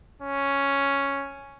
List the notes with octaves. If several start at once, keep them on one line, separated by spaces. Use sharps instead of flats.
C#4